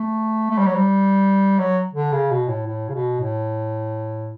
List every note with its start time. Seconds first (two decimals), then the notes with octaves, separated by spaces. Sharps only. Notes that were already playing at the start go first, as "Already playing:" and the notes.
Already playing: A3
0.51 A3
0.58 G3
0.66 F#3
0.75 G3
1.59 F#3
1.94 D3
2.12 C#3
2.31 B2
2.48 A2
2.66 A2
2.89 C#3
2.94 B2
3.20 A2